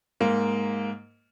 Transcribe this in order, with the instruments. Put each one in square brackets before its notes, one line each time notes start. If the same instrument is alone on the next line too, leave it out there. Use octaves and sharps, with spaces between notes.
[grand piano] G#2 A#3